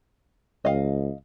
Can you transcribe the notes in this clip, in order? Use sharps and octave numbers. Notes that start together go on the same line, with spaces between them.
C#2 D#5 F5